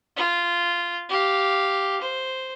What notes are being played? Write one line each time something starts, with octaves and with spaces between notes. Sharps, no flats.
F4
G4 F5
C5